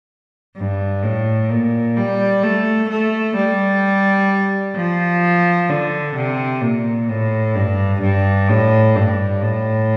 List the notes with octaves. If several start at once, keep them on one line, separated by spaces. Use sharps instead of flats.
G2
A2
A#2
G3
A3
A3
G3
F3
D3
C3
A#2
A2
G2
G2
A2
G2
A2